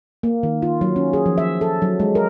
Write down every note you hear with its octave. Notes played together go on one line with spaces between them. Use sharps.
A#3
D#3
F4
F#3
C#4
G#4
F3
E5
A4
F#3
G#3
A#4